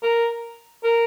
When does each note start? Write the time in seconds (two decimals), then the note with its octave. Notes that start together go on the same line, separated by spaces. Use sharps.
0.03 A#4
0.84 A#4